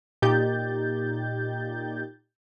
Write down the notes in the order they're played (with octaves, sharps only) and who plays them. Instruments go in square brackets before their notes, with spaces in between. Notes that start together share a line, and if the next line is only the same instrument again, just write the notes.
[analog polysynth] A#2 D#4 G4 G6 A6